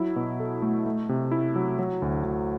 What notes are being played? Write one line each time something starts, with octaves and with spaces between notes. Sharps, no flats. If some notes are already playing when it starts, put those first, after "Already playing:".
Already playing: F#3 E4
B2
A4
A3
A3
C3
E4
F#3
F#3
D2
D2